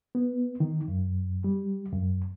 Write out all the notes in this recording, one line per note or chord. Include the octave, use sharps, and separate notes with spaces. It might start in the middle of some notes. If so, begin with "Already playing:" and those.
B3
D#3
F#2
G3
F#2